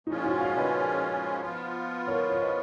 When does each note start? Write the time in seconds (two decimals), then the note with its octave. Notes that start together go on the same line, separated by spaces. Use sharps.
0.07 A#2 F3 G#3 C#4 D#4 F4
0.24 D#4 F#4
0.40 C#5 F5
0.57 B4 D#5
1.41 F3 B3 F4
2.07 A#4 C#5
2.30 C#5
2.42 B4 D#5